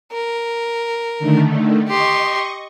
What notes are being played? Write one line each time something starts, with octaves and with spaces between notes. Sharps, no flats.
A#4
D3 D#3 A3
G4 D#5 C6 C#6